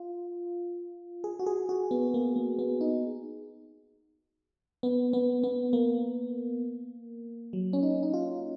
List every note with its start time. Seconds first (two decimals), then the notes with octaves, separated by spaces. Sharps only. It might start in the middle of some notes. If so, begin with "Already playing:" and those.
Already playing: F4
1.24 G#4
1.39 F#4
1.46 G#4
1.69 F#4
1.91 B3
2.14 A#3
2.36 A#3
2.59 B3
2.81 D#4
4.83 B3
5.13 B3
5.44 B3
5.73 A#3
7.53 F#3
7.73 C#4
7.83 D#4
8.03 D#4
8.14 F4